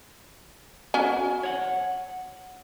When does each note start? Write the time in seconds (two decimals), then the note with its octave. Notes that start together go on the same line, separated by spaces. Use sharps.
0.94 C#4 F#4 G#5
1.43 C#5 F#5